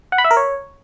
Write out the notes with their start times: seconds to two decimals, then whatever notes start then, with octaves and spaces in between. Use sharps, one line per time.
0.12 F#5
0.18 B5
0.24 E5
0.31 A#4
0.37 C#5